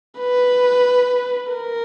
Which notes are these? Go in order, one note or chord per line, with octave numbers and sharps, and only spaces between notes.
B4
A#4